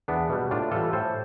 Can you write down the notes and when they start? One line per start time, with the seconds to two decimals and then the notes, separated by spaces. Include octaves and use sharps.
0.08 E2 B3 D4
0.29 B2 G3
0.51 A2 D4 F4
0.72 E3 G3 F4 A4
0.93 A2 A4 C5